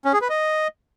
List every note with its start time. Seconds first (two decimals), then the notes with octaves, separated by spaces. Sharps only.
0.05 C#4
0.13 G#4
0.21 B4
0.30 D#5